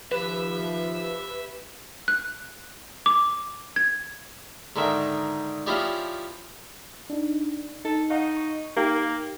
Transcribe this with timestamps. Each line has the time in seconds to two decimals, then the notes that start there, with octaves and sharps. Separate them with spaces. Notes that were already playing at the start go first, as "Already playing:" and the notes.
0.12 D#3 F3 G4 B4 E5
2.08 F#6
3.06 D6
3.76 G#6
4.76 G#2 D3 D#3 E5
5.66 F3 C#4 E4 G4 G#4 D5
7.10 D4 D#4
7.85 D#4 A4
8.10 D#4 F5 F#5 C#6
8.37 C#6
8.76 A#3 D#4 G4